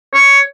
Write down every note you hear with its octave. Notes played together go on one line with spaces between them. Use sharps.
C#5